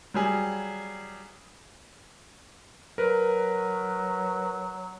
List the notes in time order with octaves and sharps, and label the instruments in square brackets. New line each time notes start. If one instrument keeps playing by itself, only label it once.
[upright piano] F#3 G3 G#4
[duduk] F#3 [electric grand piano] A#4 B4